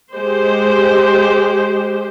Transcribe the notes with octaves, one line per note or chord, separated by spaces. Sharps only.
G#3 G4 C5